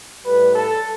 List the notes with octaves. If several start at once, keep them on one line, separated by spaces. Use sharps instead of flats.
A2 G3 B4
A4